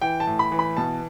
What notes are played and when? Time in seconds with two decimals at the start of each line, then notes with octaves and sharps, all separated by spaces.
0.02 E3 G5
0.20 A5
0.27 A2
0.39 B5
0.52 E3
0.59 B5
0.77 B2 A5